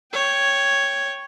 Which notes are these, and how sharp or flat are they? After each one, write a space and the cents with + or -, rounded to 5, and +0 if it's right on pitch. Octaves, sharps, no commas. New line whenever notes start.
C#5 +0 G5 +0